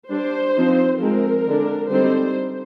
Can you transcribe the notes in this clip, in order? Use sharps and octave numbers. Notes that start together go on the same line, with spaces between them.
G3 D4 C5
F3 C4 D#4
F3 G#3 C4 A#4
D3 G#3 D4
D3 G3 C4 D#4 C5